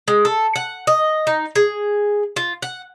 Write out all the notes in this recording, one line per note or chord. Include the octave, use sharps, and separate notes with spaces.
G#3
A4
F#5
D#5
D#4
G#4
F4
F#5